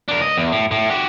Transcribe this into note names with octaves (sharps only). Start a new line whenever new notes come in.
D4 A#4
C#2 D#5
E2
A2
A2
F#4 G4